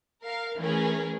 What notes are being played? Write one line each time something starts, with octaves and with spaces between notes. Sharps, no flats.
A#4 F5
E3 A3 C#4 G#4 A#4